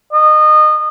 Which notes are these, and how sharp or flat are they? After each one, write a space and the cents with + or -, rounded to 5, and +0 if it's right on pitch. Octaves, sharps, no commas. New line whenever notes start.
D#5 -25